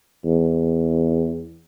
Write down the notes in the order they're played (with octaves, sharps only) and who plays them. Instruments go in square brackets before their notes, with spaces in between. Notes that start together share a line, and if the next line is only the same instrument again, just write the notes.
[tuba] E2